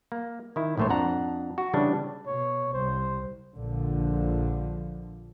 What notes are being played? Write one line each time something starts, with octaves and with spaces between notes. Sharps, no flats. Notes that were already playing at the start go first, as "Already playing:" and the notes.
A#3
D#3 E4
A#1 A2 A3 C5 C#5
F2 D4 F#5 A#5
F#4
C#3 E3 G3 D4
B2 C#5
C2 C5
A#1 D3 F3